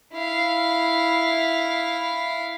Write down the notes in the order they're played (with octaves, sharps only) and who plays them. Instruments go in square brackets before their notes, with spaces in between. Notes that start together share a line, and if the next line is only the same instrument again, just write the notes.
[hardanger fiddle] E4 F5